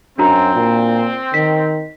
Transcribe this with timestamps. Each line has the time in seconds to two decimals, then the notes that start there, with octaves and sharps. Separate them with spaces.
0.18 F#2 C4 D4 F#4 A#5
0.55 A#2
1.34 D#3 B6